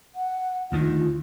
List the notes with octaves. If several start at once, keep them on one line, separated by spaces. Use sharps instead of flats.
F#5
D2 D#3 F4